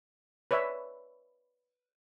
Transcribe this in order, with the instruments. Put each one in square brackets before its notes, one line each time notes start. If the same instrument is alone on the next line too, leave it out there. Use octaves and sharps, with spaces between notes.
[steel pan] B4 C#5 D5 E5